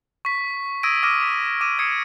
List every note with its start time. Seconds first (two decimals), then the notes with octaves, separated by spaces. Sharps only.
0.25 C#6 B6
0.83 D#6 E6 G#6 A#6 D7 D#7
1.03 D6 D#6 F6 A#6 B6 D#7
1.20 D6 B6
1.61 D6 E6 D#7
1.79 D#6 G#6 C7 C#7